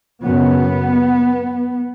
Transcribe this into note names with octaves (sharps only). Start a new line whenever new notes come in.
F#2 C#3 B3